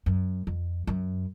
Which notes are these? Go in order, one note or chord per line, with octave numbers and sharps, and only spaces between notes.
F#2
F2
F#2